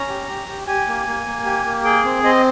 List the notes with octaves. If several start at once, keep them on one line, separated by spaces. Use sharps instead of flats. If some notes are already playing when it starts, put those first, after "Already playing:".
Already playing: C#4 A#5
G4
G4
G4
G4 G#5
A#3
A#3
A#3
G4
A#3
G#4 G5
C4
C4 D#5